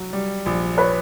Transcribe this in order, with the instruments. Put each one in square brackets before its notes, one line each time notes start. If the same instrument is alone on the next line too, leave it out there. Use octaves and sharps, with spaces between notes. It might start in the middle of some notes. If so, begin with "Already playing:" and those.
Already playing: [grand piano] F#3
G3
A#1
[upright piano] B4 C#5